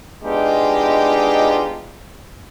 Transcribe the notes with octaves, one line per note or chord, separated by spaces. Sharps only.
G#3 B3 D4 D#4 F4 G4